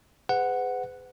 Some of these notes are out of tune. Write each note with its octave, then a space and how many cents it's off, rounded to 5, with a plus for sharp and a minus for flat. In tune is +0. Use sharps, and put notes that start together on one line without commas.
G#4 -5 B4 +45 F#5 +0